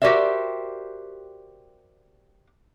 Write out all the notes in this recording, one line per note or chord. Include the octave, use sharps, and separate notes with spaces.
F#4 G4 A#4 C5 D5 E5